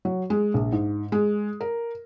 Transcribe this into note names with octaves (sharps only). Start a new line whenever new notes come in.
F#3
G#3
A#1
G#2
G#3
A#4